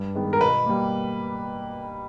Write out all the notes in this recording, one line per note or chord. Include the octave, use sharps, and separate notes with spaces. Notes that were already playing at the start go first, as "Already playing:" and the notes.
Already playing: G2
D#3 G#3 B3
A#4
B2 B4
G3 A#3